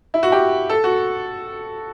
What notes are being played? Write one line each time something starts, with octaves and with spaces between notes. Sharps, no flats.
E4
F#4
G4
A4
F#4